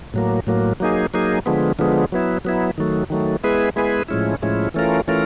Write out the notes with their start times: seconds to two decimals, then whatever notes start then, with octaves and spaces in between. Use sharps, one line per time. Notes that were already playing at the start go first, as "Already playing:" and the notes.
0.14 A2 F#3 A#3
0.47 A2 F#3 A#3
0.80 F#3 A#3 D#4 G#4
1.14 F#3 A#3 D#4 G#4
1.46 D3 F3 G#3 B3
1.79 D3 F3 G#3 B3
2.12 F#3 B3 E4
2.45 F#3 B3 E4
2.78 D#3 F#3 A3
3.10 D#3 F#3 A3
3.44 G#3 B3 E4 G#4 B4
3.76 G#3 B3 E4 G#4 B4
4.09 A2 F3 G#3 C#4 E4
4.42 A2 F3 G#3 C#4 E4
4.74 E3 A3 C#4 F4 A#4
5.08 E3 A3 C#4 F4 A#4